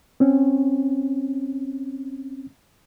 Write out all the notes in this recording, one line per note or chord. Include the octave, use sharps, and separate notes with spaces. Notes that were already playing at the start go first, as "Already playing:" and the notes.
C4 C#4